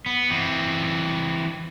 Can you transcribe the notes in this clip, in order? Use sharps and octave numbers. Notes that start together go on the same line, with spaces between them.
B3
E3 C4